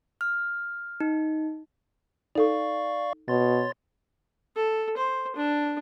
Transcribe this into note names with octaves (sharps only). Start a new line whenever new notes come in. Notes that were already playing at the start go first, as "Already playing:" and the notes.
F6
D#4
D#4 A4 D5 F5 C#6
B2 C#5 C6 A6
A4
C5
D4